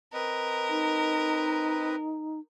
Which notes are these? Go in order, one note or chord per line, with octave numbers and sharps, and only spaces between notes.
C4 A#4 B4 D#5
D#4